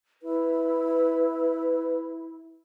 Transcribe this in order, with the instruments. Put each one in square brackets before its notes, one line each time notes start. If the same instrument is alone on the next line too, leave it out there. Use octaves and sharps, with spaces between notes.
[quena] E4 [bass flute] B4